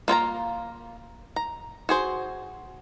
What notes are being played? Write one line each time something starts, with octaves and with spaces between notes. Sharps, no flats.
A#3 F4 C#5 A#5
A#5
F#4 G#4 C5